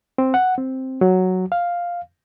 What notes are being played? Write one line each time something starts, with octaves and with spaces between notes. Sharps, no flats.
C4
F#5
C4
F#3
F5